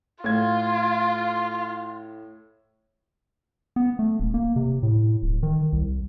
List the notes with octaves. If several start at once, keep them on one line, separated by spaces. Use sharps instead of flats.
A2 F4 G#6
B3
A3
D#1
A#3
C3
A2
D1
D#3
C2